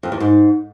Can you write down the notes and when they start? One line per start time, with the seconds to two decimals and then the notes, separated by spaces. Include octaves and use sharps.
0.03 F2
0.12 E2
0.20 G#2